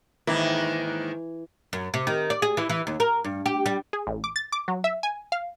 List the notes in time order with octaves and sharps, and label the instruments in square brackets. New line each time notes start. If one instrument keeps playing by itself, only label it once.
[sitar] G#2 D#3 A#3 [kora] E3
[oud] F#2
C3
D#3
D5
G#4
E3
E3
D#2
A#4
G2
G4
G3
[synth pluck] G#4
A1
D6
A6
D6
F#3
E5
G#5
F5